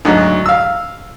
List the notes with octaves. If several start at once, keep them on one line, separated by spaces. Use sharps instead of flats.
D2 G#2 F#3
F5 E6